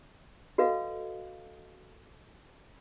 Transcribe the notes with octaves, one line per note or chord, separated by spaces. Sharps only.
F#4 A4 B4 D#5 F5